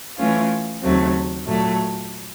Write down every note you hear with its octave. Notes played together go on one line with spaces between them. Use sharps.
E3 A3 C#4 F4
D#2 C#3 F#3 A3 C4
A#2 F#3 A3